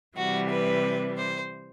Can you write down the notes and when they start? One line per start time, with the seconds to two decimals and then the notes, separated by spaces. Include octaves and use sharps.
0.17 C3 E3 G3 F#4
0.50 B4
1.17 C5